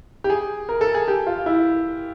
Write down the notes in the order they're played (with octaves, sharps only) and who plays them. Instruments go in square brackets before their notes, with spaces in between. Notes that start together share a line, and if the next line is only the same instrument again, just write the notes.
[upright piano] G4
G#4
A#4
A4
G#4
G4
F4
E4